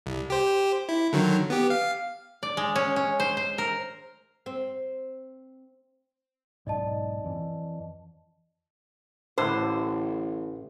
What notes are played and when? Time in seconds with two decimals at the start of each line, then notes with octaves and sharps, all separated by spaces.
0.06 C2
0.30 G4 C5
0.89 E4
1.13 D3 D#3 F#3
1.50 B3 G4
1.70 F5
2.43 D5
2.57 G#3
2.76 C#4
2.96 C#4
3.20 C5
3.37 C5
3.58 A#4
4.46 C4
6.67 B1 G#2 D5 D#5 A5
7.24 F2 E3
9.38 A1 A2 D3 C5